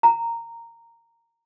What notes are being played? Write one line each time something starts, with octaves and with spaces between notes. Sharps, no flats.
A#5